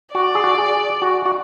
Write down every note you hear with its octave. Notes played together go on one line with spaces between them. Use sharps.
F#4 D5
G#4
F#4
G#4
F#4
F#4